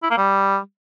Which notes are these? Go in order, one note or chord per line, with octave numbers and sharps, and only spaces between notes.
E4
A#3
G3